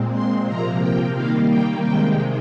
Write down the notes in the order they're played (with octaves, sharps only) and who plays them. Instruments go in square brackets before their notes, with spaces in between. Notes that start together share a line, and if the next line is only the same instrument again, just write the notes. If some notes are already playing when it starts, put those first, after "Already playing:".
Already playing: [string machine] A#2 G#3 C4
C6
C3 F3 A#3 A#5
G5
D#3 G3 A#3 F5
G5
C3 D#3 G#3 G5